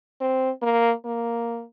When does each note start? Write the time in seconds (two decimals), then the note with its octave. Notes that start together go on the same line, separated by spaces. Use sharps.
0.21 C4
0.62 A#3
1.05 A#3